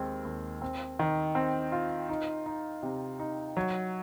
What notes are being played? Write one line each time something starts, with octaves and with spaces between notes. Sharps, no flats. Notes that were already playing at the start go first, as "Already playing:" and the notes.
Already playing: D#2 G#3 C4
D#2
C4
D#3
C4
F4
D#4
D#4
C3
D#4
F#3